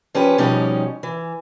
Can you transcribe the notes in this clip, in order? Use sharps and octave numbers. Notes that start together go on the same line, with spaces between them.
F3 C#4 G4 B4
B2 F3 G3 C#4 D#4 G4
E3